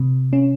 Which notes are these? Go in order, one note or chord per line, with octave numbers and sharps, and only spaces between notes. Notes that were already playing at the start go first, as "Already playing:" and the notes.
Already playing: C3
C#4